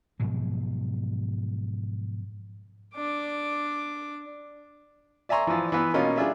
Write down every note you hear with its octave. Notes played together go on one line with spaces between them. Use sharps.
G#2 B2 F3 F#3
D4 D6
D5 E5 G#5 A#5 C6 C#6
E3 F3
E3 B3
B2 A#3 C#4 D#4 F4
G3 D4 F4 G#4 E5